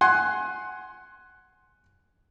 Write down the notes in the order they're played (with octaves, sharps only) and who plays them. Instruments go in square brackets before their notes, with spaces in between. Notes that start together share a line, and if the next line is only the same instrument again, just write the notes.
[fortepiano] F#5 G#5 C6